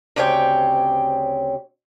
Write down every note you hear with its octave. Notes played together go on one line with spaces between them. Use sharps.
D2 C#3 C4 G4 C#5 G5